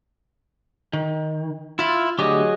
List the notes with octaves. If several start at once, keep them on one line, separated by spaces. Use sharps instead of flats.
D#3
E4 F4 E5
D2 F#3 G4 G#4 D#5